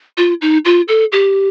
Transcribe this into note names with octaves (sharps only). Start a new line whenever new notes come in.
F4
D#4
F4
A4
G4